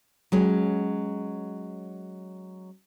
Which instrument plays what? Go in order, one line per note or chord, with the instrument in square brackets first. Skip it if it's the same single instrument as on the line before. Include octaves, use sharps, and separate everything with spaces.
[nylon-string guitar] F#3 G#3 C#4